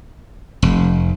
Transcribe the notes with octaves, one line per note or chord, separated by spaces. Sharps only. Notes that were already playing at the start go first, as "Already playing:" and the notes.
F1